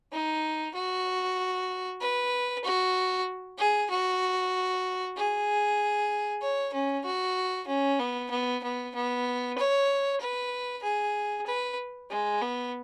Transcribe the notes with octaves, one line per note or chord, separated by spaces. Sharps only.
D#4
F#4
B4
F#4
G#4
F#4
G#4
C#5
C#4
F#4
C#4
B3
B3
B3
B3
C#5
B4
G#4
B4
G#3
B3